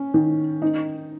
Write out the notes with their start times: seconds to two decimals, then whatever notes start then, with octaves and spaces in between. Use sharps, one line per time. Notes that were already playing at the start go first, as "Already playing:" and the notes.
Already playing: C#4
0.14 D#3
0.62 D#4